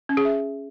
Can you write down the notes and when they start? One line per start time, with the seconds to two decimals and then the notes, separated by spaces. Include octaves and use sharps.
0.09 C#4
0.17 G#4
0.25 E5